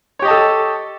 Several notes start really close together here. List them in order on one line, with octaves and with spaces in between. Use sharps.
C#5 G4 D#5 A5 A4